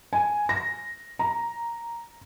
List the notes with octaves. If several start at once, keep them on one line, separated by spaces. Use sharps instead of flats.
G#5
A#6
A#5